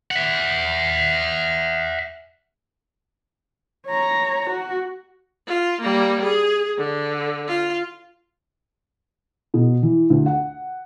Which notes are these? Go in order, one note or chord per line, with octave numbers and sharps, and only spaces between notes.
E5 F#5
C#5 A#5
F#4
F4
G3 A#3
G#4
D3
F4
B2
E3
D2
F#5